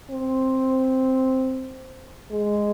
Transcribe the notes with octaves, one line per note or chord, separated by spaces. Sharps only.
C4
G#3